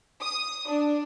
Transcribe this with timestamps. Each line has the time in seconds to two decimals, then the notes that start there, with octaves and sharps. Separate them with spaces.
0.21 D#6
0.67 D4